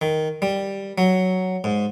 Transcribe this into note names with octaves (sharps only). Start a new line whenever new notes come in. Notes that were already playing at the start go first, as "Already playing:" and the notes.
D#3
G3
F#3
G#2